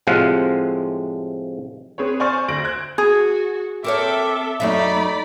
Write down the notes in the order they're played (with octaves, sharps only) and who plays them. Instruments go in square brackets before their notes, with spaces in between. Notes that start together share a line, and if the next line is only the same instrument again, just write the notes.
[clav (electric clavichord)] A2 C3 F3 G#3 F5 F#5
[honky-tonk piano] C4 G#4 B4 C#5
C5 D5 G#5 C#6 F6 A6
D2 A#6 D7 F#7
C5 F#6 G#6
[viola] F#4 [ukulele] G#4
[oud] C4 A#4 C#5 [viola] A4 E5 [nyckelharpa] D6
[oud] F#2 F#3 E5 [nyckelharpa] A3 D#4 [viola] D5 B5